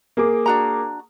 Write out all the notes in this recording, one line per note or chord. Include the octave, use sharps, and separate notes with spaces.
A#3 G#4 D6
D4 F#4 A#5